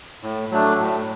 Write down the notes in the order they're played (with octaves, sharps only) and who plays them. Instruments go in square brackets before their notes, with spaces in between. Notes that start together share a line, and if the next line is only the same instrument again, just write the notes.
[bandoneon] A2
F#3 A3 D4
A2